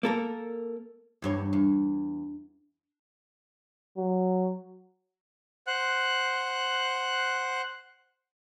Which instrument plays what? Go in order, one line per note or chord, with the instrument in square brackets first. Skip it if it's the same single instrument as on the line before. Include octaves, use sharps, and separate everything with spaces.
[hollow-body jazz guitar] A#3 A4 A#4
[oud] E2 G2 C#5
E2
[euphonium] F#3
[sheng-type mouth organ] C5 F#5 F#6